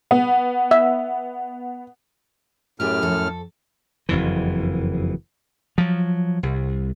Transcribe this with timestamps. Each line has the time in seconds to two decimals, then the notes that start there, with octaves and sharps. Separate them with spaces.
0.11 B3
0.71 E5
2.80 F#2 A2 G4 G#4 D5 F6
3.02 F2 A4
4.09 F#1 F2 E3
5.78 F3 F#3
6.43 C2